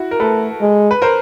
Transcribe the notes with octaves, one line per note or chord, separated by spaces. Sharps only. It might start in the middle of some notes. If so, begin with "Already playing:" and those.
Already playing: E4 F#4
A#4
A3 A4 B4
G#3
B4
A#4 C5